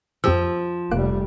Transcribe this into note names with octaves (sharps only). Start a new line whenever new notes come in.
F2 F3 G4 E6
F1 G3 A#3 F#6 D7